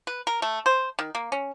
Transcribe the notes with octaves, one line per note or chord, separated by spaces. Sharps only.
B4
A#4
A3
C5
D#3
A#3
C#4